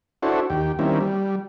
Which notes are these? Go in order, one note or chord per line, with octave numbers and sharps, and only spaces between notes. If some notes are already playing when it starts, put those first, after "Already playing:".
D4 E4 F#4 A4 C5 C#5
D#2 G4
D#3 G3 A#3 C4 C#4 E4
G3